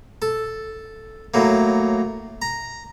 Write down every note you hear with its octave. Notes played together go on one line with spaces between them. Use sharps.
A4
A2 F#3 A#3
A#5